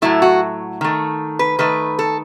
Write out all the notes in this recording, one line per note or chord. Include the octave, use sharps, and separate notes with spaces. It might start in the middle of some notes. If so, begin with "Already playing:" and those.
A2 F#3 A3 E4
F#4
D#3 A3
B4
D#3 A3 B4
A4